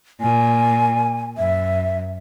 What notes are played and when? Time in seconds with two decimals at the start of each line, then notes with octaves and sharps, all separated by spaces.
0.21 A#2 G#5
1.38 F#2 E5